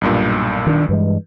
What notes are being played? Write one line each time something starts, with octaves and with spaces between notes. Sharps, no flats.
B1 G2 A#2
D#3 D4
G2 E3 G#3